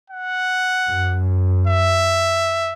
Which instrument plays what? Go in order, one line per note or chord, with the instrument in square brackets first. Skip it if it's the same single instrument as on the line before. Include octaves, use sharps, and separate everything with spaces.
[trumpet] F#5
[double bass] F#2
[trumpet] E5